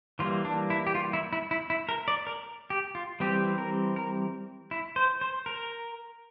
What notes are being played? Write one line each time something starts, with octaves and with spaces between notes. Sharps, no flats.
E3 G3 A#3 F4
D4
E4
G4
F4
E4
E4
E4
E4
A#4
D5
A#4
G4
F4
E3 G3 C4 G4
A#4
A#4
E4
C5
C5
A#4